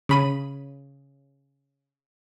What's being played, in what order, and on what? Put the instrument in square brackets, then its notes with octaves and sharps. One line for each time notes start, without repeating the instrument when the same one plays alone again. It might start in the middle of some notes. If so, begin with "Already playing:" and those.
[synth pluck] C#3 B5 D#7